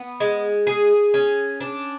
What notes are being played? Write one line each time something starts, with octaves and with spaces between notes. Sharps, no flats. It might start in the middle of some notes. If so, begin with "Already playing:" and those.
Already playing: B3
G#3
G#4
C#4
D4